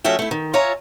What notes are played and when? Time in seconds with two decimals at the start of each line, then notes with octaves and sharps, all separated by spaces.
0.04 F3 A3 C#4 F#4 E5 G5
0.19 A3 E4
0.31 D#3
0.54 F4 C#5 E5 G#5 A#5